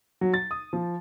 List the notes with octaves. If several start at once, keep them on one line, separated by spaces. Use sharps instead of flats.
F#3
A6
D#6
F3